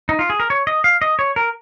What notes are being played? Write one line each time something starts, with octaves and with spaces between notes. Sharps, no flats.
D#4
F4
G#4
A#4
C#5
D#5
F5
D#5
C#5
A#4